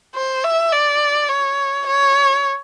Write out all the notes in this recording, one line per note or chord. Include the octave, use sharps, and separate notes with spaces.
C5
E5
D5
C#5
C#5